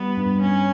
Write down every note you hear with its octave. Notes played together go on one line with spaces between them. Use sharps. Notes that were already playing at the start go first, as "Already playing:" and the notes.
Already playing: G3 B3
G2
G2 C#4